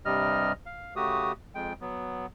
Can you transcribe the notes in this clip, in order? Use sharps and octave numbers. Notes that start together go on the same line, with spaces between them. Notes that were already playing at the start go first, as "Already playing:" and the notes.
G2 C3 G3 D#5 F6
F5
C#3 A3 F#4 G4 D#6
F2 G#3 G5
F#3 B3